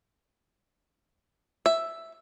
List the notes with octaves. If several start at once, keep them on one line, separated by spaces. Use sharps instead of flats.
E5